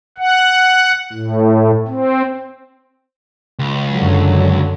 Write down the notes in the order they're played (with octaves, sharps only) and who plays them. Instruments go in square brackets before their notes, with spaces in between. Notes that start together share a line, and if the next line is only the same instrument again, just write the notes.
[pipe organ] F#5
A2
C4
[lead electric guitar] C#2
[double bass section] F#2 D3 F#3